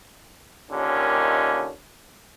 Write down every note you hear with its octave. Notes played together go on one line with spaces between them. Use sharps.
D#2 A#2 D3 D#3 A#3 C#4